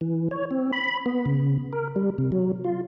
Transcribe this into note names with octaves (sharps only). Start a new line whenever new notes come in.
E3
C#5
C4
B5
B3
C#3
A#4
G3
C3
F#3
F4